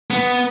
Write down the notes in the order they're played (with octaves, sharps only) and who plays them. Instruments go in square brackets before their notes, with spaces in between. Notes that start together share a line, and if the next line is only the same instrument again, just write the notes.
[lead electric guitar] B3